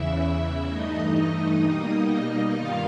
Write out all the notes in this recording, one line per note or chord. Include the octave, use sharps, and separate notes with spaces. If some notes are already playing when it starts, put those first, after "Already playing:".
Already playing: E2 C#3 E3 E4 E5
G2 E3 A3 D#4 D#5
B2 G3 A#3
G2 D#3 G3 A#3 F4 F5